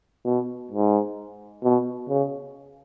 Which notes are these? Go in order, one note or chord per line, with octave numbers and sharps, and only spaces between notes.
B2
G#2
B2
C#3